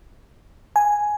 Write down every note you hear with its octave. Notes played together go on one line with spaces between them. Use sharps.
G#5